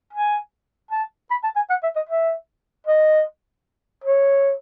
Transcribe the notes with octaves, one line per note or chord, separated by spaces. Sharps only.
G#5
A5
B5
A5
G#5
F#5
E5
D#5
E5
D#5
C#5